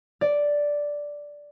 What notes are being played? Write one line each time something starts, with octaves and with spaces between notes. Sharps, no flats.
D5